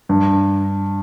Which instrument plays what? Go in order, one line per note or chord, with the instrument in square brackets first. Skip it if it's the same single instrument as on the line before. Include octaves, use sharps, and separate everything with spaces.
[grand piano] G2